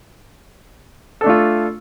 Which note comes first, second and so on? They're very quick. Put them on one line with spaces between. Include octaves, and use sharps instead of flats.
A4 D4 A3 F4